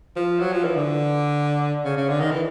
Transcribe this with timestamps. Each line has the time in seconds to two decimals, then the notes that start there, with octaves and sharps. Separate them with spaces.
0.16 F3
0.40 F#3
0.52 F3
0.64 E3
0.76 D3
1.84 C#3
1.96 C#3
2.09 D3
2.20 D#3
2.31 E3